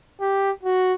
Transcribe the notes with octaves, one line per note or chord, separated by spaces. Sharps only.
G4
F#4